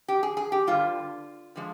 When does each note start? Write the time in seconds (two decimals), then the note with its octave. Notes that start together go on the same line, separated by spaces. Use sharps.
0.08 G4
0.23 G#4
0.37 G#4
0.52 G4
0.67 G2 D3 G3 F4
1.56 D3 F3 G#3